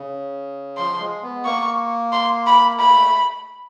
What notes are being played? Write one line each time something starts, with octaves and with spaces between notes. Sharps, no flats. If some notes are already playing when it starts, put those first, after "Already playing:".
Already playing: C#3
F3 C6
G#3
B3
A#3 C#6
C6
B5
A3 B5